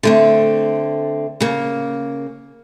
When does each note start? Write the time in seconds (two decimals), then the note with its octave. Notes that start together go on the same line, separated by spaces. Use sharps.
0.03 D3 A3 C4
1.40 C#3 A#3